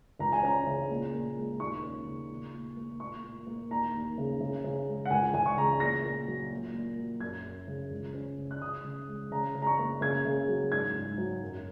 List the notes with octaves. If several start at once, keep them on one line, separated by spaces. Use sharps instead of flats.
C#2 A#5
G#5
C#4 A#5
C#3
A#2
A#2
G#3
D#2 C#6
C#4
C#3
A#2
A#2
A#3
A#2 C#6
A#2
A#3
D#2 A#5
D#2
C#3
C#3
C#3
G#3
F#5
C#2 G#5
C#2 G#5
C#6
C#3 A#5
A#2 A#6
A#2
F#3
A#2
A#2
F#3
F#2 G#6
F#2
C#3
C#2
C#4
C#3
F#6
C#3 D#6
C#3
G#3
C#3 A#5
C#3
A#5
C#6
A#3
C#3 G#6
C#3
F#3
G#2 G#6
G#2
F#3
F#2